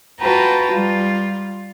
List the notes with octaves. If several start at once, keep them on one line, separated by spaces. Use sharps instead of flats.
F4 F#4 B4 G5 A5 A#5
G3 F4